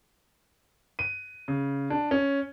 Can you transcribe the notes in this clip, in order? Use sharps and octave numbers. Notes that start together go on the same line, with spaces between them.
D#7
C#3
D4
C#4